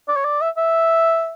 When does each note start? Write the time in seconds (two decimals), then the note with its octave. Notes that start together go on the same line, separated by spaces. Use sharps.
0.08 D5
0.16 C#5
0.25 D5
0.42 E5
0.57 E5